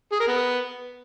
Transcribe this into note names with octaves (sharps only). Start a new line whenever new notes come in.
G#4
A#4
B3